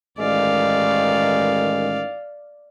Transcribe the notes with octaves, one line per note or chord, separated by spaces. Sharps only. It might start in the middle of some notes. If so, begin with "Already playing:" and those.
A1 D#3 G#3 D5 F5